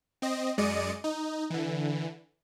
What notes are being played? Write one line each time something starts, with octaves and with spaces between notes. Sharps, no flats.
C4 D#5
F#2 G#3 D5 D#5 C#7 D#7
D#4
D3 E3